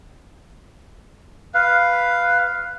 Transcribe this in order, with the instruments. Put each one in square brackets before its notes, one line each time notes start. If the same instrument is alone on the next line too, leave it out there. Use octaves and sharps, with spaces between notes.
[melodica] B4 F5